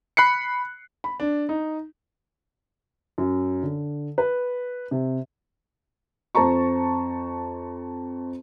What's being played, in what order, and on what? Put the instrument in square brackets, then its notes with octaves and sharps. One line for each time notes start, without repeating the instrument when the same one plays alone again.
[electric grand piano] B5 F#6 C7 C#7
[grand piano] B5
D4
D#4
[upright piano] F#2
D3
B4
C3
[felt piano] F2 C5 A5 A#5 C#6